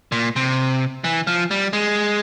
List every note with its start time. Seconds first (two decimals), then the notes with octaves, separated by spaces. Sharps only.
0.12 A#2
0.36 C3
1.04 E3
1.27 F3
1.51 G3
1.73 G#3